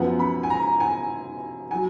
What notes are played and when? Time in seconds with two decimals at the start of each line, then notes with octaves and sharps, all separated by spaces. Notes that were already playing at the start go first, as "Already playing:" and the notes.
Already playing: F#2 F3 B3 F#5
0.19 B5
0.43 G#5
0.50 A#5
0.80 G#5
1.71 F#3 G#5